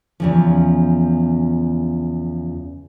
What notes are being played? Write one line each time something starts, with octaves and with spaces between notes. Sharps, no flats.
E2 C#3 F3